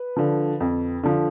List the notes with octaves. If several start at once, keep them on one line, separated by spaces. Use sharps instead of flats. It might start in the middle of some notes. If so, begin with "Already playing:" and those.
Already playing: B4
D3 F3
F2
D3 F3